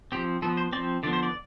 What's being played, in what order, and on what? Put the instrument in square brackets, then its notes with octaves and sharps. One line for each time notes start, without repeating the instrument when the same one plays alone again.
[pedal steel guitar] F3 C4 G4
F3 B3 A4
C5
C4 D5
F3
D3 F3 B3 D5
C5
D5